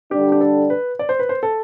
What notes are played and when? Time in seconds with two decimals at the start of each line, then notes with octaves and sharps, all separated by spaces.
0.11 D3 G3 D4 G4
0.32 G4
0.41 A4
0.70 B4
0.99 D5
1.09 C5
1.19 B4
1.29 C5
1.43 A4